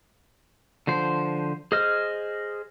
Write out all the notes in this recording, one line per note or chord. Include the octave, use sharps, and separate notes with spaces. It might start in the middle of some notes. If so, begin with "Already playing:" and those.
D3 F3 C5
G#4 C5 D#5 F6